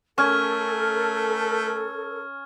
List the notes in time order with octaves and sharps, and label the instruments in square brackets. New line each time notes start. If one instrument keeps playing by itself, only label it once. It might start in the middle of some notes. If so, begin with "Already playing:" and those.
[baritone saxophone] A3 [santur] C#4 [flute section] A4 A#4 [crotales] C#6 F6 G#6